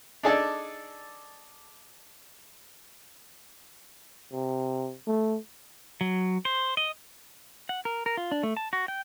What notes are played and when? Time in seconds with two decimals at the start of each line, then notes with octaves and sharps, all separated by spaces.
0.23 D4 D#4 G#4 A4 D5
4.33 C3
5.07 A3
6.01 F#3
6.45 C5
6.77 D#5
7.69 F#5
7.85 A#4
8.06 A#4
8.17 F4
8.32 D4
8.43 A3
8.57 A5
8.73 F#4
8.88 G5